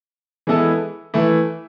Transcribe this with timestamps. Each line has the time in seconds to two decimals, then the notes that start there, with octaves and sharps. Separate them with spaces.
0.47 E3 G#3 B3 E4 A4
1.14 E3 A3 E4